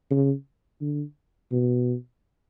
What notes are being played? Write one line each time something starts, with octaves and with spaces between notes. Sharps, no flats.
C#3
D3
B2